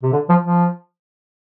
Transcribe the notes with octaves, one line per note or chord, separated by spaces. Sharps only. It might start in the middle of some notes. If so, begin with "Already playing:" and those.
C3
D3
F3
F3